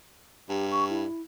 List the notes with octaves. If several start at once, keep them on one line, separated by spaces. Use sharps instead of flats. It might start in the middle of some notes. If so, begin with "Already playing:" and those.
G2 G4
C#6
E4